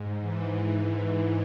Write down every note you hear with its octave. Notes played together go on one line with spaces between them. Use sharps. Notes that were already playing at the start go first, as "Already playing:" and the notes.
Already playing: G#2
E3